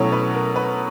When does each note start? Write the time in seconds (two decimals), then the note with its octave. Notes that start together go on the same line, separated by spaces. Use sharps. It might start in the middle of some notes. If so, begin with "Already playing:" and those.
Already playing: B2 F#3 A3 C#4 E4 C#5
0.12 B4
0.34 A#4
0.56 B4